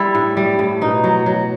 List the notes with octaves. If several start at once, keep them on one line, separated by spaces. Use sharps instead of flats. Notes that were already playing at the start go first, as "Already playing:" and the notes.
Already playing: G3 E4
A2
G3
A2
B2 D#4
F#3
F#3